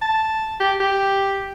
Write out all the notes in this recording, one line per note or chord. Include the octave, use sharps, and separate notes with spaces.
A5
G4
G4